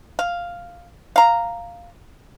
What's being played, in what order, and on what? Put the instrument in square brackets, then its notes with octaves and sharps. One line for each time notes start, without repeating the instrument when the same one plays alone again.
[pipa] F5
F5 A#5